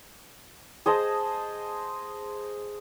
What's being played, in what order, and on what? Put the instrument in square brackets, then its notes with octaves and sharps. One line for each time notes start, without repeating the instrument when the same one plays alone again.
[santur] G#4 C5 D#5 A5